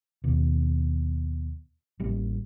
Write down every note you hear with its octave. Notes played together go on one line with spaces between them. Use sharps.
D#2 B2
A1 G3 A#3